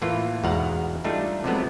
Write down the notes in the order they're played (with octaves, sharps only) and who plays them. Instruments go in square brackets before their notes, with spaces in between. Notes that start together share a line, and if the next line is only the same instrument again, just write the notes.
[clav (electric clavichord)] A2 E3 A#3 F4
E2 G#2 B2 F5 F#5 A#5
G3 A3 D4 D#4 F4
C3 F3 F#3 G#3 A3 B3